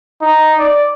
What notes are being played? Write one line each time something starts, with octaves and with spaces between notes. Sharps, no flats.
D#4
D5